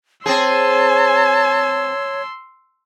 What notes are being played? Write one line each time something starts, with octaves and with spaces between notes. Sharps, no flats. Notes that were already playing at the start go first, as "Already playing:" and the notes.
C4 G#4 C#5 A5 C6 E6